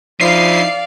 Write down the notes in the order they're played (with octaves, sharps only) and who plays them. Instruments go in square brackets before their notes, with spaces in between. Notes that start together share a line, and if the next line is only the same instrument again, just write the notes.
[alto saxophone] F3 [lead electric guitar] D#4 E4 [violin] D5 F5 [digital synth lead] C7